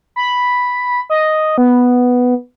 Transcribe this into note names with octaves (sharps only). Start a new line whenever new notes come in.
B5
D#5
B3